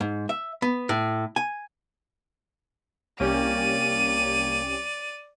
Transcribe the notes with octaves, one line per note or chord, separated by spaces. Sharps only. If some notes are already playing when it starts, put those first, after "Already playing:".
G#2
E5
B3
A2
G#5
C2 A#3 C#4 G4 D5 D#7